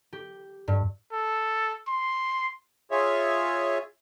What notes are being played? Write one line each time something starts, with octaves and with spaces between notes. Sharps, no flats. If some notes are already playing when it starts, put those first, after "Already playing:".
G4
G2
A4
C6
F4 G#4 C#5 E5